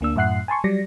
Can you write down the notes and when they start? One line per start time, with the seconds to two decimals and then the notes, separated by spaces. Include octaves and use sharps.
0.01 D2 A#3 D4 E6
0.16 F#2 A2 E5 F#5 F#6 C7
0.48 G#5 A5 C6 C#6
0.64 F#3 G3 D5 A#6